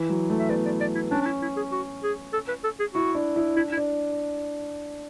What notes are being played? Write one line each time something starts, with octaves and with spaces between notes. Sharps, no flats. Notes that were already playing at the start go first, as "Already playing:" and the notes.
Already playing: E3
F#3
A3
E5
B3 D5
D5
D5
E4
C#4 D4
D4
E4
E4
G#4
F#4
G#4
A4
B4
A4
G#4
E4 F#4
D4
E4
D4 E4
E4
D4